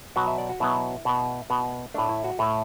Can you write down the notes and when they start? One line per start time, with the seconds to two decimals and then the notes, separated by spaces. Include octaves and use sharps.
0.16 B2 F#3 B3 F#4
0.27 E5
0.38 D5
0.49 F#4
0.60 B2 F#3 B3 E4
1.05 B2 B3
1.50 B2 B3
1.94 A2 A3 D4
2.09 E4
2.24 F#4
2.39 A2 A3 A4